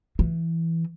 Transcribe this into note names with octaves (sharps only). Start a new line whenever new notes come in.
E3